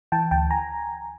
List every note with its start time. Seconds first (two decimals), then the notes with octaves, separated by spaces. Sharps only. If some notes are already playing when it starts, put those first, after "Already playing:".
0.12 E3 G5 A5
0.31 D2 G5 A5
0.51 G#5 A#5